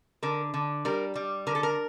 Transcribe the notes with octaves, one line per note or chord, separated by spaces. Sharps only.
D3 A#4
D3
G3 A#4
G3
D3 A#4
A4
A#4